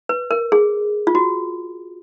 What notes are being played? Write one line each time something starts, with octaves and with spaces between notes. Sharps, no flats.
B4
A#4
G#4
F4
F#4